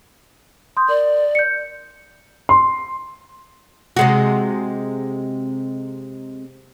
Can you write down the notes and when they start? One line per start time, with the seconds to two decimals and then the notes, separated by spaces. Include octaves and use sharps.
0.77 C6 D#6 G6
0.89 A#4 D5
1.35 G6 C#7
2.49 C6
3.96 C3 G#3 F#4